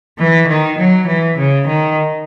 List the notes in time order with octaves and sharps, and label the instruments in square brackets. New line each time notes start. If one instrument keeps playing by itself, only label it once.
[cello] E3
D#3
F#3
E3
C#3
D#3